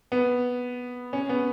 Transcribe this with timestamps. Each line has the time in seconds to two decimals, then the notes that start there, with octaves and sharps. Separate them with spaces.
0.12 B3
1.13 C#4
1.29 B3